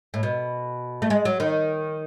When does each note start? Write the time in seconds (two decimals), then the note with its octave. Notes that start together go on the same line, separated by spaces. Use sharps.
0.14 A2
0.23 B2
1.02 A3
1.10 G#3
1.25 F#3
1.40 D#3